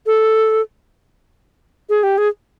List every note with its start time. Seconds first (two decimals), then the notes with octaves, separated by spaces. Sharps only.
0.06 A4
1.89 G#4
2.03 G4
2.18 G#4